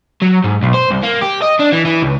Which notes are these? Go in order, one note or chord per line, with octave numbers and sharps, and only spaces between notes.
F#3
G#2
B1
C5
C2
A#3
G4
D#5
D4
E3
E3
C#2